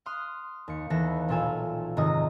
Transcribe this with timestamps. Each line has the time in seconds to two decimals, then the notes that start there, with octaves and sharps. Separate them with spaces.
0.06 C6 D#6 F6 F#6
0.68 D#2 C#7
0.90 D#2 E3 B3 A4 A#6
1.28 B1 A#2 F4 A4 G#5 E7
1.97 F1 G#2 D#3 D#5 D#6 A#6